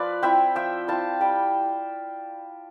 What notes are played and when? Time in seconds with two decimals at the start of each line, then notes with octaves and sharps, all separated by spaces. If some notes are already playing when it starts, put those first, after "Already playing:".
Already playing: F3 B4 D5
0.23 C4 E4 E5 G5
0.55 F3 E5 G5
0.88 C4 E4 F5 A5
1.21 G3 G5 B5